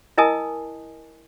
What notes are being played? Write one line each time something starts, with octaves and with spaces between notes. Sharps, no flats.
E4 A#4 D#5 G#5 A5 D#6